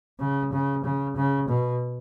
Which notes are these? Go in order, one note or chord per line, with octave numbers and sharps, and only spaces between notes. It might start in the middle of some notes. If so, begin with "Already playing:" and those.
C#3
C#3
C#3
C#3
B2